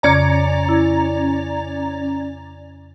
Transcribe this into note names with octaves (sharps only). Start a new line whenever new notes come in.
F2 C#3 C#4 D5 A#5 D6
E4